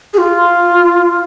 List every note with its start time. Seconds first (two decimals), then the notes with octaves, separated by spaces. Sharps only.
0.14 G#4
0.18 F4